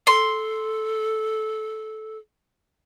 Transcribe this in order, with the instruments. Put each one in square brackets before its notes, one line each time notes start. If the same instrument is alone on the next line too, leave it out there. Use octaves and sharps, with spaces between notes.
[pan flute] A4 [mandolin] C6